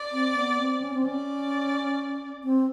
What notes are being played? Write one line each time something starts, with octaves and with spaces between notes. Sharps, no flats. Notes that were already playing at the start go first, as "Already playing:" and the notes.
Already playing: D5
C4
B3
C4
C#4
C4
C#4 D5
C4